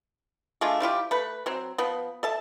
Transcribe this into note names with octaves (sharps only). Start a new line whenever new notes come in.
G#3 A3 D4 F4
G3 E4 F4 G4
A3 B4
F#3 C4
F3 B3
A4 E5 A5